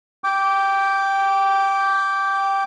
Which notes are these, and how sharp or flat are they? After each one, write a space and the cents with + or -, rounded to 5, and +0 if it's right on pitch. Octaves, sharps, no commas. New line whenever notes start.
G5 +0 D6 -15